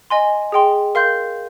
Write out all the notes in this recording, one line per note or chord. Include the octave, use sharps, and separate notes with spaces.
D#5 G#5 C6
G#4 D#5 G5 C6
A#4 F5 C6 G6